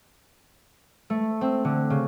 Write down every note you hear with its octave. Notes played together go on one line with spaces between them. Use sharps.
A3
C4
D3
C#3